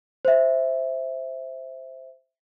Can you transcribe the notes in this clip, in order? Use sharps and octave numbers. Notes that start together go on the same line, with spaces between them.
C5 E5